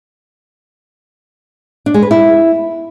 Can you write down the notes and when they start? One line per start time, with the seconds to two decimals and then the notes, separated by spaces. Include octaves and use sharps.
1.86 D4
1.94 G#3
2.03 B4
2.11 E4